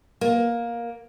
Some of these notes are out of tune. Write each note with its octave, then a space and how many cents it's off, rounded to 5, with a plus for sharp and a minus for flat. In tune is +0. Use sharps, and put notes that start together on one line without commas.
A#3 +10